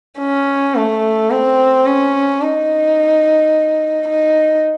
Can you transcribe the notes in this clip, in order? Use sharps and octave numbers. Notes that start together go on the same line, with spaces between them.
C#4
A3
C4
C#4
D#4
D#4